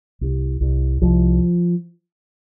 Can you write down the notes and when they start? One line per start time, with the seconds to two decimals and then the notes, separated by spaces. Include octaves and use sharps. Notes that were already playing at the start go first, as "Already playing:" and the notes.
0.21 C2
0.61 C2
1.02 C2 F3